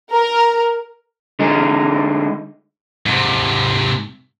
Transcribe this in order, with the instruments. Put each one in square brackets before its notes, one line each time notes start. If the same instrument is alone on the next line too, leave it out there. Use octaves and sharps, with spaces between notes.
[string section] A#4
[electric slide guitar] D3 G#3 D#4
[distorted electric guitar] G#2 C3